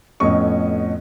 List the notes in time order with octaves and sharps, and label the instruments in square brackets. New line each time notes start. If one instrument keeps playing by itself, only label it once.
[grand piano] F2 A2 B3 C#4 D#5 C#6